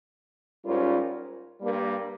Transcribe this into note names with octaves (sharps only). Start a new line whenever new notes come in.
G#2 G3 C#4 F4 A#4
G2 G3 A#3